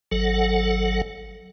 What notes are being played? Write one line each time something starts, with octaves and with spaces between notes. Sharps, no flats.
G#1 F#3 A4 F#5